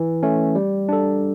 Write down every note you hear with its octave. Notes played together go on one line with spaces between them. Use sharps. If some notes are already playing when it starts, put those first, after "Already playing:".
Already playing: E3
A3 C#4
G3
D4 A4